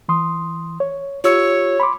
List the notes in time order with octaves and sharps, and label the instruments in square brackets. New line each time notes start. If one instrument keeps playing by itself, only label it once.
[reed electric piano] E3 C6 D#6
C#5
[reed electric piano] F4 G4 E6 [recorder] C#5
[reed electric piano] B5 C6 D6